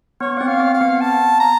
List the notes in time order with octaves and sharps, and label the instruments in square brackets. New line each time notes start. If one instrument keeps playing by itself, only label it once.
[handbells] B3 [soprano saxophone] C#5
[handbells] C4 [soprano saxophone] F#5
[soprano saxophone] F5
[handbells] C4
[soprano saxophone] F5
[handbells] B3
[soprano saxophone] A5
A#5